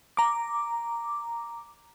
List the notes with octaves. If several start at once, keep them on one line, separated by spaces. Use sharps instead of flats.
A#5 D6